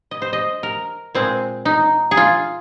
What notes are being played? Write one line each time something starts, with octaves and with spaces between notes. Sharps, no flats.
D#5
C5
D#5
A#4
A#2 G#3 C4
D#4
G#4
F4